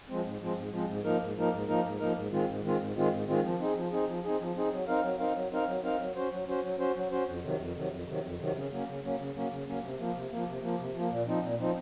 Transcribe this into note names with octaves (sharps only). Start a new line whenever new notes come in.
F3 G#3 C4
G#2
F3 G#3 C4
G#2
F3 G#3 C4
G#2
F3 A#3 D#4 A#4
G#2
F3 A#3 D#4 A#4
G#2
F3 A#3 D#4 A#4
G#2
F3 A#3 D#4 A#4
G#2
D#3 G#3 C4 F4
G#2
D#3 G#3 C4 F4
G#2
D#3 G#3 C4 F4
G#2
D#3 G#3 C4 F4
F3
C4 D#4 G#4
F3
C4 D#4 G#4
F3
C4 D#4 G#4
F3
C4 D#4 G#4
F#3
C4 D#4 A#4 F5
F#3
C4 D#4 A#4 F5
F#3
C4 D#4 A#4 F5
F#3
C4 D#4 A#4 F5
F#3
C#4 F#4 C5
F#3
C#4 F#4 C5
F#3
C#4 F#4 C5
F#3
C#4 F#4 C5
F2
C3 D#3 F#3
F2
C3 D#3 F#3
F2
C3 D#3 F#3
F2
C3 D#3 F#3
C#3
F#3 A#3 C#4
C#3
F#3 A#3 C#4
C#3
F#3 A#3 C#4
C#3
F#3 A#3 C#4
C3
F3 A#3
C3
F3 A#3
C3
F3 A#3
C3
F3
A#3
A#2
F3 C4 D#4
A#2
F3 C4 D#4